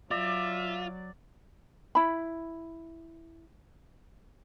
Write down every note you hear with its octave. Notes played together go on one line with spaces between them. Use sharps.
F#3 F4 D5 E5
E4 B5